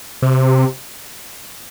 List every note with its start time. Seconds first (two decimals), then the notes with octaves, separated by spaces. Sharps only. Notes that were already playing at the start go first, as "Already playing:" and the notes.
0.22 C3